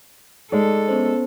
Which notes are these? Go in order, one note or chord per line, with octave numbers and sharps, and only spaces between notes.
G#3 D#4 A4 D5
B3 C#4 C5